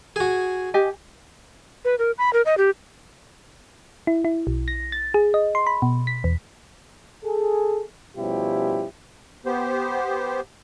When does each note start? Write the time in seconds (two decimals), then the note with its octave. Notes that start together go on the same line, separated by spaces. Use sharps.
0.16 F#4 G#4
0.74 G4 D#5 G#5
1.85 B4
1.99 A#4
2.18 B5
2.33 A#4
2.46 D#5
2.58 G4
4.07 E4
4.25 E4
4.47 B1
4.68 A#6
4.92 A6
5.14 G#4
5.34 D#5
5.55 C6
5.67 B5
5.82 B2
6.07 B6
6.24 E2
7.24 G#4 A4
8.17 B2 F3 G3 C#4 E4 G4
9.46 B3 G4 C5